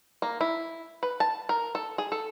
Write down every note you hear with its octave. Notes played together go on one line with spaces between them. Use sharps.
A#3
E4
B4
A5
A#4
A4
G#4
A4